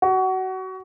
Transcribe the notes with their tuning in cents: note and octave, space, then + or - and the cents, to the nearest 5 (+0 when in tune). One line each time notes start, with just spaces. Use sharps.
F#4 +25